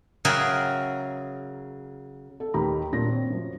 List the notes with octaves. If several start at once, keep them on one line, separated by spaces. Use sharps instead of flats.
C#3 F#3 G#4 A#4 E5 G5
A4
D#2 D#3 G4 A#5 B5
F#2 A#2 D4 A#6
C4 C#5
F#2 F3